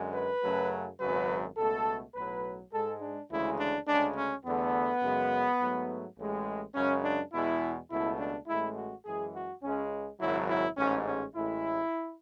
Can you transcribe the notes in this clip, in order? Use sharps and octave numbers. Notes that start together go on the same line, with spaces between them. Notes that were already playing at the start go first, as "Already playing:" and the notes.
Already playing: F#2 D3 G#3
B4
F#2 C#3 F#3 A3
G#1 F#2 C#3 F#3 B4
C#2 B2 A3 A4
B1 A2 F#3 B4
G#2 G#3 A4
D4
D2 C#3 E3 G#3 E4
D4
D2 C#3 G#3 D4
C#4
E2 D3 A3 B3
F#2 C#3 G#3
G#2 F#3 A3
A1 A2 G#3
F#2 C#3 G#3 C#4
D4
E2 B2 G#3 E4
C#2 B2 A3 E4
D4
A1 A2 G#3 E4
F#4
F#2 E3 G#3 G#4
F#4
C#2 C#3 G#3 C#4
G#1 F#2 C#3 F#3 E4
E4
A1 G#2 G#3 C#4
C#4
A1 A2 G#3 E4